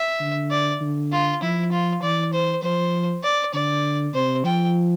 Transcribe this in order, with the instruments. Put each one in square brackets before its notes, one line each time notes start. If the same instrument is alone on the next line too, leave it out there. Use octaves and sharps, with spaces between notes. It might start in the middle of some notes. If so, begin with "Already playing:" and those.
Already playing: [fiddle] E5
[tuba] D3
[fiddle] D5
[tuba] D3
[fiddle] F4
[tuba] F3 [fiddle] E4
[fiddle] F4
[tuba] E3 [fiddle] D5
[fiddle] C5
[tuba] F3 [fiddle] C5
[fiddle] D5
[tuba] D3 [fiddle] D5
[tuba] C3 [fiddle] C5
[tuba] F3 [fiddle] G5